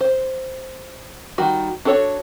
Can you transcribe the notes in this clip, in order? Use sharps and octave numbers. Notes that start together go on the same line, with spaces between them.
C5
D#3 G3 F#4
D4 F#4 A4 A#4 C#5